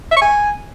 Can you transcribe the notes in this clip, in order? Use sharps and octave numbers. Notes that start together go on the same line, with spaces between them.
E5
C#6
G#5